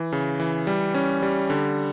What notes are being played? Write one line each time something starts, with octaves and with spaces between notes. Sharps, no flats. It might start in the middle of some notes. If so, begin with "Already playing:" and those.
Already playing: E3
C#3
E3
G3
C#4
G3
D3